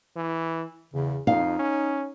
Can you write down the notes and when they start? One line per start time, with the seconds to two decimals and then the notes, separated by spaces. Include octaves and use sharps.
0.16 E3
0.93 E2 C#3
1.27 F2 D#4 F5
1.59 C#4